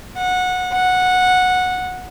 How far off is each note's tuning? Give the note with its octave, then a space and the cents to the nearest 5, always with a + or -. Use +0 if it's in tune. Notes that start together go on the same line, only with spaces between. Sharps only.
F#5 -20
F#5 -15